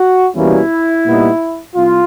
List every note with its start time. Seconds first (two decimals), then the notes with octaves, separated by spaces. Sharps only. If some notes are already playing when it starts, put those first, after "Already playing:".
Already playing: F#4
0.35 E2 B2 G3 A#3 C#4 E4
1.06 A#2 G3 B3 D#4
1.75 C2 F4